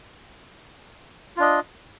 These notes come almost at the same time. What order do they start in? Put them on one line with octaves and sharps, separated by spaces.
F4 D4 D#5